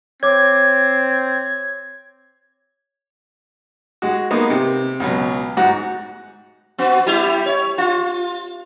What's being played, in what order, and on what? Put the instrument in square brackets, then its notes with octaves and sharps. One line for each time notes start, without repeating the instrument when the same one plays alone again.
[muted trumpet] C4 [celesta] C#5 D6 [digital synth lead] G#6
[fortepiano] G#3 F#4
G#3 A#3 B3 D#4
C3
C#2 B2 F#3
G#2 F#4 F#5 F#6
[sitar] B3 F#4
G3 E4 G4
C#5
F4